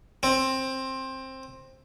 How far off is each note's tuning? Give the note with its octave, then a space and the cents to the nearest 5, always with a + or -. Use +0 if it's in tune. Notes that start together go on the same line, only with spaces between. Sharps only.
C4 +15